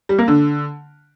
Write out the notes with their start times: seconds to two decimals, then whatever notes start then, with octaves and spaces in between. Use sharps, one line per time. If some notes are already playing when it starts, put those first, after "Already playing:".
0.09 G3
0.19 A#3
0.28 D3